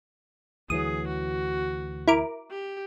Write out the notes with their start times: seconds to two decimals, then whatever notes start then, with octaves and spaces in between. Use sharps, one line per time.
0.70 D2 E3 F#3 G#4 D#6
1.08 F#4
2.08 E4 A#4 D6
2.51 G4